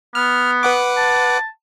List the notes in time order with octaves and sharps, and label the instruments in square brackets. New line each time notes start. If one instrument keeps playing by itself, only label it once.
[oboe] B3 [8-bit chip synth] F6
[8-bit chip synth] B4 F#5 D6
[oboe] A5